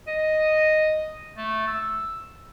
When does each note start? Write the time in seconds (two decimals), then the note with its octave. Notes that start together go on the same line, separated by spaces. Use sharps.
0.07 D#5
1.37 A3
1.68 E6